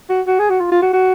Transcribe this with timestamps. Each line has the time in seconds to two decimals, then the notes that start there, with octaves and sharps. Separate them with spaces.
0.09 F#4
0.27 F#4
0.39 G#4
0.50 F#4
0.60 F4
0.71 F4
0.82 F#4
0.93 F#4